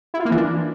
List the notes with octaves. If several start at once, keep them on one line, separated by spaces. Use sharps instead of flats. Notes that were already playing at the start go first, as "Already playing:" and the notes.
E4
F4
A#3
E3
D4